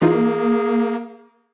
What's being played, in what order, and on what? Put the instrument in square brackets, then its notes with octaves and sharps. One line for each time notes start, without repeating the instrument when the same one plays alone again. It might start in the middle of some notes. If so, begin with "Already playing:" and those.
[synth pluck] E3 D#4 F4 [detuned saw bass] A#3 [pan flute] G#4